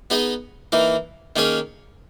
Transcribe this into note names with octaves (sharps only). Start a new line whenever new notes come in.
B3 D#4 G#4 D#5
E3 A#3 D#4
D#3 A#3 C#4 G#4 C#5